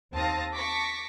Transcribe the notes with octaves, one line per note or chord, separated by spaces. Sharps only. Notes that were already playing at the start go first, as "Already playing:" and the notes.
D#2 C4 F5 A5 D#6 A#6
A5 C#6 D6 A#6 B6